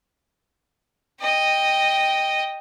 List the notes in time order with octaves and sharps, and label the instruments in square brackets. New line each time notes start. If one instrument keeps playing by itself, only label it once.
[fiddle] D#5 G5